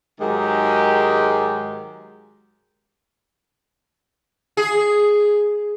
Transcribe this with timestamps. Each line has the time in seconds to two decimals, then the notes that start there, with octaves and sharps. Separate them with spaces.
0.20 G#2 D#3 F#3 G#3 G4 D#5
4.57 G#4